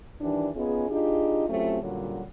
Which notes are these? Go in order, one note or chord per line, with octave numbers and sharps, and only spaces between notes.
D#3 E3 G3 D4
B3 C#4 D#4 F4 G#4
D4 D#4 F4 G4 G#4
F#3 A3 C4 C#4 F4 G4
A#2 D3 F#3 G3 C#4 F#4